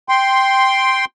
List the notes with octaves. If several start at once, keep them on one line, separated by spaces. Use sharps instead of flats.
G5 C6